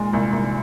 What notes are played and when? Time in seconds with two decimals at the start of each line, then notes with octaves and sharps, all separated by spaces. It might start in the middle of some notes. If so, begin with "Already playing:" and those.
Already playing: A#2 G#3
0.13 C2
0.33 C2